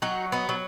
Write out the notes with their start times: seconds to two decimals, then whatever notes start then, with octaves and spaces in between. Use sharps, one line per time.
0.02 F#3 D#4 F#4
0.32 B3 D#4
0.49 F#3